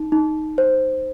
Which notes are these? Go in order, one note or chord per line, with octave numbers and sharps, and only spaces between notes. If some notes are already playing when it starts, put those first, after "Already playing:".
Already playing: D#4
D#4
C5